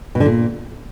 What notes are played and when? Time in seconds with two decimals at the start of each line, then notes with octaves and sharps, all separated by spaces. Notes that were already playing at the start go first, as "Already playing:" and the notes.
0.15 B2
0.20 D3
0.26 A#2